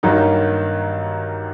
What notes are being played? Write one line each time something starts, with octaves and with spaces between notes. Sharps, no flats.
G2 D#3 F#3 A#3 D#4